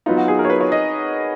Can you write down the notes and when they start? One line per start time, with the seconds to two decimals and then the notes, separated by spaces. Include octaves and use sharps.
0.06 F#3 B3 D#4 F4
0.17 F#4
0.28 G#4
0.39 A#4
0.45 C#5
0.50 B4
0.61 C#5
0.72 D#5